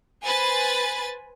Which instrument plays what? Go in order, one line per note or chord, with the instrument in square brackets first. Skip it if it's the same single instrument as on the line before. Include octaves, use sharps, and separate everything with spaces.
[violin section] B4 C5 G#5 B5 A6